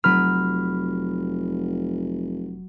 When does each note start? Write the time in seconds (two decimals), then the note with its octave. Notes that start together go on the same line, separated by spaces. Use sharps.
0.04 F1 F#3 B5 F6